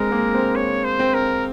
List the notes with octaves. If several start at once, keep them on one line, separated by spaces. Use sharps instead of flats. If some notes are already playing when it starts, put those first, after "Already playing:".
Already playing: G#3 C4 A#4
A#3
C4
C#5
C5
C4
A#4